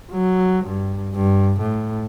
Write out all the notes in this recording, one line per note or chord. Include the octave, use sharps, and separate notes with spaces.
F#3
G2
G2
A2